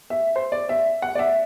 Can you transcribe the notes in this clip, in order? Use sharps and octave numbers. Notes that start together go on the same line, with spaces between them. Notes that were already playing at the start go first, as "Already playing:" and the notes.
E5
C5
D5
E5
F#5
D5
E5